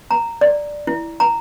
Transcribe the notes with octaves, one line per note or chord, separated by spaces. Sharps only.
A#5
D5
E4
A#5